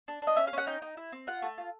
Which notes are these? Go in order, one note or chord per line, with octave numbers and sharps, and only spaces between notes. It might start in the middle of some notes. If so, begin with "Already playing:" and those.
D4
D4 D#5
C#4 E5
F5
C#4 F#5
D#4 G5
D#4
E4
C4
F4 F#5
A3
F4